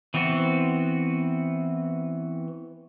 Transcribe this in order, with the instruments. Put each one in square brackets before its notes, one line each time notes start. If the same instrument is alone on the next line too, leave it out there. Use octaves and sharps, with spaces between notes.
[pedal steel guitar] E3 B3 C4 F#4